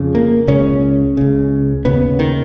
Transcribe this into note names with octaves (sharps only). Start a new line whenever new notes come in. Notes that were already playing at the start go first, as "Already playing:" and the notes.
Already playing: F2 C#3
A#3
C#2 C#3 C#4
C#2 C#3
D#2 C#3 B3
D#3